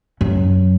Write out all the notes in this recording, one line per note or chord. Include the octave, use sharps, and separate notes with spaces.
F#2